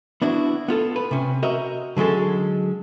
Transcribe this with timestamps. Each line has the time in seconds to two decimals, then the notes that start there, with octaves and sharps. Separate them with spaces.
0.22 B3 D4 E4 F#4
0.68 B3 F4 A4
0.96 B4
1.11 C3 C#4
1.43 F#4 A#4 C5 D#5 E5
1.97 D3 F#3 G#3 C#4 A4